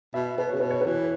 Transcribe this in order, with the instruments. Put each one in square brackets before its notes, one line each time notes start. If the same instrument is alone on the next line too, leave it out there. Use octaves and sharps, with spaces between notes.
[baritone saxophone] B2 [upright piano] E5
[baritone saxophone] B2 [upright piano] B4
[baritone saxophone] C#3 [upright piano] C#5
[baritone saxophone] B2 [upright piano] B4
[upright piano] C#5
B4
[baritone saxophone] E3